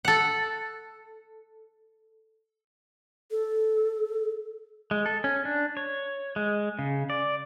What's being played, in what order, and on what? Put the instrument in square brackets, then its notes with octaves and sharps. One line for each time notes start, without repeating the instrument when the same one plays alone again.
[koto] A4 F#5
[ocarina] A4
[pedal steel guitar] G#3
A4
C#4
D4
C#5
G#3
C#3
D5